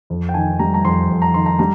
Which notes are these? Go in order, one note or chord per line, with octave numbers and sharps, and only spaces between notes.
F2
G5
D#3 G#5
G3 A#5
A#5
F2 C6
F2
A#5
D#3 C6
A#5
G3 A#5